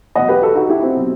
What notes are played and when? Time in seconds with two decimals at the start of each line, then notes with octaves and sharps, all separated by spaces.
0.15 E2 B2 F#3 D#5 F#5
0.29 G4 B4
0.42 F#4 A4
0.55 D#4 F#4
0.69 E4 G4
0.82 C4
0.96 B2 F#3